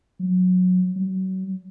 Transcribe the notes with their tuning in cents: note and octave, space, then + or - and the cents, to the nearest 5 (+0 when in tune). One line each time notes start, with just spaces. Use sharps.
F#3 -20
F#3 +30